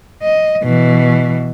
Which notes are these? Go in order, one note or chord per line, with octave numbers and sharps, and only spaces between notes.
D#5
B2 E3